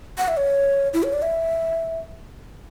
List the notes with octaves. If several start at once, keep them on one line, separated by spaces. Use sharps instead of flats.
F#5
E5
C#5
E4
C#5
D5
E5